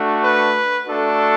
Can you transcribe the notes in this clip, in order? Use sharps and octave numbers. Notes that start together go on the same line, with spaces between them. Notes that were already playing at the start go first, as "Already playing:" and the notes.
Already playing: A3 D4 F#4
B4
A3 D4 F#4 A4